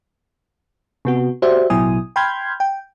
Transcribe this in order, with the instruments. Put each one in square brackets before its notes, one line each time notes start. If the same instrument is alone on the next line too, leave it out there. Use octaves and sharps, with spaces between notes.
[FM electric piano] C3 B3 F#4
F#4 G4 C5 D5 E5
A1 B2 F#3 E4 G#5 D#6
G5 B5 C6 F6 G6 G#6
G5